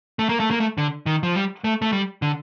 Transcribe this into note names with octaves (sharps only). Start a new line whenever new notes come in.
A3
A#3
A3
A#3
A3
D3
D#3
F3
G3
A3
A3
G3
D3